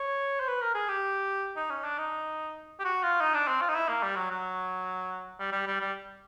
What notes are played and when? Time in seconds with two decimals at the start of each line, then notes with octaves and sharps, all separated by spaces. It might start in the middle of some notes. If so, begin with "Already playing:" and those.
Already playing: C#5
0.40 C5
0.48 B4
0.61 A#4
0.75 G#4
0.89 G4
1.56 D#4
1.70 C#4
1.84 D4
1.98 D#4
2.80 G4
2.84 F#4
3.03 F4
3.21 D#4
3.34 D4
3.48 C4
3.61 F4
3.69 D#4
3.75 E4
3.88 A#3
4.03 G3
4.16 F#3
4.30 F#3
5.40 G3
5.52 G3
5.67 G3
5.80 G3